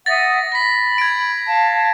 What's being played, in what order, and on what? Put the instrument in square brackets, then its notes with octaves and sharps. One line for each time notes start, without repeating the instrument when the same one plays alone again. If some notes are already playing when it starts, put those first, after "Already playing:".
[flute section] E5 F#5 D#6 [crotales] A6 A#6
[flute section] B5 [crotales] A#6 B6
[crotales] G#6 D7
[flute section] F5 A5